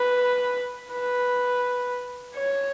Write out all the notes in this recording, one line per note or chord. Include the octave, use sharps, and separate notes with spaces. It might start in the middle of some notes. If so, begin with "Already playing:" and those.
Already playing: B4
B4
C#5